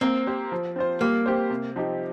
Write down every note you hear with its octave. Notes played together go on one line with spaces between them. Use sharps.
A#3 C4
G4 C5
F3
C4 F4 C5
G3 A#3
C4 G4 C5
C3
F3 C4 D#4 G4